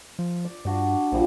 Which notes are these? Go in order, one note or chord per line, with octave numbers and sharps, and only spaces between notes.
F3
D5
G2 D4 F#4
A#1 A#2 F3 G3